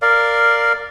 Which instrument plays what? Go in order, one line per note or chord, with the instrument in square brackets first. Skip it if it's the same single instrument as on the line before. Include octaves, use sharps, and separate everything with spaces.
[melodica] A#4 D5 F5